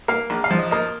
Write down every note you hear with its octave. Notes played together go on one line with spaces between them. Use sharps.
A#3 F5
A#1
F5
F3
D#5
A#3 D#5